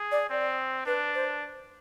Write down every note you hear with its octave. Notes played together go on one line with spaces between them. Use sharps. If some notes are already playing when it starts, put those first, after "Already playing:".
Already playing: G#4
D5
C4 D5
D4 B4
C5